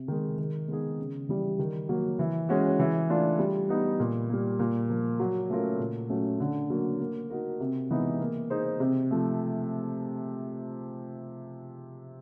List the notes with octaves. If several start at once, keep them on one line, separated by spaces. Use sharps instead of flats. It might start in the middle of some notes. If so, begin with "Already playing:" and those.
Already playing: C3
D#3 G#3
D#3
G#3 B3 D#4 G#4
C#3
E3 G3
D#3
F#3 A#3
E3
G#3 C#4 F#4
E3
A3 D4 F4
G3
B3 D#4
A#2
G3 A#3
A#2
F3 A#3
F#3
A3 C#4 F4 A#4
A#2
F#3 A3 C#4
D3
F#3 A#3
A#3
D#4 F#4 A#4
C3
E3 G#3 B3 D#4
A#3
D#4 G#4 C5
C3
F3 A3